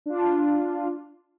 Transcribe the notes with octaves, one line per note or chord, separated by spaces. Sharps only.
D4 F4